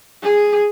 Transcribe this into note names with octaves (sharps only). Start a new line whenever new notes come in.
G#4